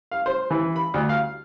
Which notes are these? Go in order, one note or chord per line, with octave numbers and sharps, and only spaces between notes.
F5
C5
E3
B5
D2
F5